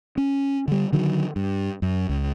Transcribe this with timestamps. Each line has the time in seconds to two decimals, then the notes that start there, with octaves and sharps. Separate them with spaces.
0.17 C#4
0.68 D3 G3
0.93 D3 D#3 F#3
1.36 G2
1.82 F#2
2.09 C#2